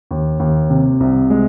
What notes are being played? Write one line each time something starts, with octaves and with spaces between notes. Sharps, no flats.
D#2
D#2
C3
C2
G#3